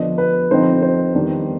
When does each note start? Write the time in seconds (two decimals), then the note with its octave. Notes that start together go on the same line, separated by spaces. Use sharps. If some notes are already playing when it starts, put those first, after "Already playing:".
Already playing: D3 F3 B3 D4 D#5
0.18 B4
0.51 D3 F3 C4 D#4 C5
0.82 C5
1.14 D#3 G3 B3 D4